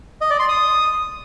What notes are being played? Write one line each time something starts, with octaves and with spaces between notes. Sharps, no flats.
D#5
D5
C6
D#6